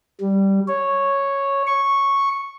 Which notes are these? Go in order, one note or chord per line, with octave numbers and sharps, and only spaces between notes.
G3
C#5
C#6